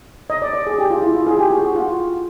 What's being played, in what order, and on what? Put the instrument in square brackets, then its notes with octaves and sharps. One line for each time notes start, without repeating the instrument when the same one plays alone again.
[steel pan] D#5
D5
D5
G#4
G4
F4
E4
F4
G#4
G4
F#4
F#4
F4